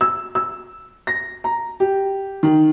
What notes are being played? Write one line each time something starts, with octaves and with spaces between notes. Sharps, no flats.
E6
E6
A#6
A#5
G4
D#3